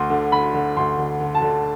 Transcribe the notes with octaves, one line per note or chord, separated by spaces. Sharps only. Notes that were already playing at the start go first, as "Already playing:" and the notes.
Already playing: D2 C6
D3
D3 B5
D3
D2 C6
D3
D3
A5
D3